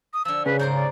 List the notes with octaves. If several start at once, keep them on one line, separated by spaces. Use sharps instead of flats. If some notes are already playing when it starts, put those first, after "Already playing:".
D#6
D3 F3 E6
C#3 B4
G#2 A#4 C5 G6
D5